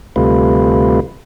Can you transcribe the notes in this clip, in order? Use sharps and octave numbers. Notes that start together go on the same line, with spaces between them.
D2 C3 G3 A3 F4 B4